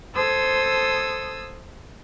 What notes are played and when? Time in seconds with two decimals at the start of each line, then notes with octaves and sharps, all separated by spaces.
0.14 A4 C5 D#6 E6 G#6